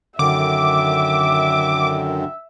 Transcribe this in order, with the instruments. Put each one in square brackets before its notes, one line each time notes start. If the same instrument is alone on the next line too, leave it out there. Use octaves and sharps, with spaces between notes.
[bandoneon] F#2 D#3 [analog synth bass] D3 [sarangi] E5 [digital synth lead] D6